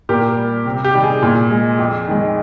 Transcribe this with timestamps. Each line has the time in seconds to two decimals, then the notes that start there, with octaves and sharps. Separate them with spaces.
0.09 A#2 G4 A#4
0.37 G3
0.66 C3
0.85 G4
0.94 D#3 G3
1.03 G#4
1.23 A#2
1.51 G#3
1.79 F2
2.08 D#3 G#3